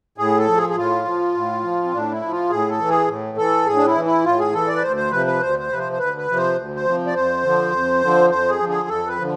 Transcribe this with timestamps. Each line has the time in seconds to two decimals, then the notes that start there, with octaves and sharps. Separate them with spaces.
0.18 A2 G#4
0.38 A4
0.47 F3
0.57 G#4
0.70 G#4
0.76 A2 F4
1.05 F3
1.34 A2
1.63 F3
1.84 C4
1.92 A2 D4
2.11 E4
2.22 F3
2.31 F4
2.50 A2 G#4
2.69 A4
2.79 E3
2.89 G#4
3.08 A2
3.37 E3 A4
3.66 A2 G#4
3.76 D4
3.86 E4
3.95 E3
4.05 E4
4.24 A2 F4
4.39 G#4
4.53 E3 A4
4.68 D5
4.76 B4
4.82 D2 C5
4.96 C5
5.11 C3 F3 B4
5.26 B4
5.40 D2 C5
5.59 C5
5.69 C3 F3 B4
5.79 C5
5.92 C5
5.98 D2 B4
6.18 B4
6.28 C3 F3
6.36 C5
6.56 D2
6.76 C5
6.85 C3 F3
7.06 D5
7.14 F2 C5
7.43 D3 F3
7.72 F2
8.01 D3 F3
8.30 F2 C5
8.49 G#4
8.59 D3 F3
8.69 G#4
8.88 F2 A4
9.07 B4
9.17 D3 F3